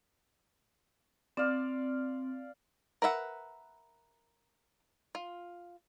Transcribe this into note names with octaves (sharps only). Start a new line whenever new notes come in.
C4 D5 F5
A#4 B4 E5 F#5
F4